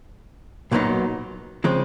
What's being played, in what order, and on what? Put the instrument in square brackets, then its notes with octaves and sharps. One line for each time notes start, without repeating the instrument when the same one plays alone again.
[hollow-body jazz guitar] B1 A#2 F#3 B3 D#4
C#3 F3 G#3 C4